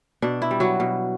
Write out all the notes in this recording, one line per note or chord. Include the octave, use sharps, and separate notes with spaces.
B2 D4
E4
G3
F#3 F#4
B2